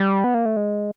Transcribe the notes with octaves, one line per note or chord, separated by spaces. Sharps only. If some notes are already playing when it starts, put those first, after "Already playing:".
Already playing: G3
B3
A#3
A3
G#3